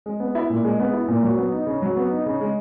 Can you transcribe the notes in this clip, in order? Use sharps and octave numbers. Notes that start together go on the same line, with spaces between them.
G#3
B3
E4
A#2
G#3
B3
E4
A#2
F#3
B3
D#4
C#3
F#3
B3
D#4
C#3
G#3